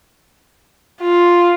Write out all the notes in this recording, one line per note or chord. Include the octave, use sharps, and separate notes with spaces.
F4